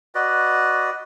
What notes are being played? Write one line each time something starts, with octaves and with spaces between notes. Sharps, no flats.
F#4 B4 D5 D#5